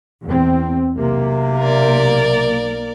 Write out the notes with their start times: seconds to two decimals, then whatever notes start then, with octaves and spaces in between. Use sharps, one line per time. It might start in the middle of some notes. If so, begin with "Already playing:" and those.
0.24 E2 C4
0.97 B1 C3 A#3
1.60 A#4 D5